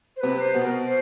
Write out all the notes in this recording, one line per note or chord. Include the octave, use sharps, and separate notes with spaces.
C5
C3 C4 B4
C5
B2 B3
A#4
C5